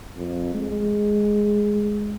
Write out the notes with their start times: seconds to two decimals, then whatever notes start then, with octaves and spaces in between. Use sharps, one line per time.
0.17 F2
0.54 G#3